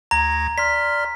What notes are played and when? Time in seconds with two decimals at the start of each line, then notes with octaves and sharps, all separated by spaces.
0.11 D2 A#5 G#6 A#6
0.58 D5 C6 F6 B6